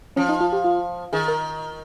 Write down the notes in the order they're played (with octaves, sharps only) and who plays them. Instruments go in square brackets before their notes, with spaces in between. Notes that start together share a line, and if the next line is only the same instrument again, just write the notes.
[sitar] F3 [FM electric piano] C#4
[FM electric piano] D#4
F4
G4
F4
[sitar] D#3 [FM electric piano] G#4
[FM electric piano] A#4